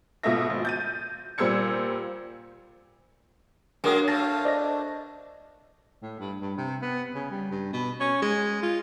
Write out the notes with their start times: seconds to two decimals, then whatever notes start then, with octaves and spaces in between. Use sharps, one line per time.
0.23 G#2 B2 A3 F4 E5 A#6
0.50 G#1
0.65 G6 A6 D#7
1.38 A#2 G3 C5 E6 G#6 C#7
3.84 F#3 G#3 A#3 D4 G#4 A#4 D#6
4.08 A3 C#5 F5 A5 A6 A#6
4.45 D4 C5 D5 D#5 A#6
6.02 A2
6.20 G2
6.41 G2
6.58 C3
6.82 B3
7.15 C#3
7.31 G3
7.51 G2
7.73 B2
8.01 C#4
8.22 G#3
8.63 F4